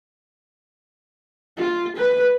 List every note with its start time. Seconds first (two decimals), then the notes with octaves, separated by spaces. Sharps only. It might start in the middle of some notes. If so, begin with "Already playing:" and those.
1.57 F4
1.97 B4